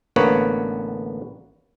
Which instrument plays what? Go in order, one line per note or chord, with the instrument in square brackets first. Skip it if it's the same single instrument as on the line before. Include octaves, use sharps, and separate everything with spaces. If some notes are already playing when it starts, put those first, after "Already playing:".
[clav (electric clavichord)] A1 D3 A#3 B3 B4 C#5